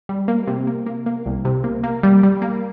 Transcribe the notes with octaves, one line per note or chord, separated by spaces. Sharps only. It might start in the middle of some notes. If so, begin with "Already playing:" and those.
G3
A#3
C3
A#3
A#3
A#3
C2
C3
A#3
A#3
G3
G3
A#3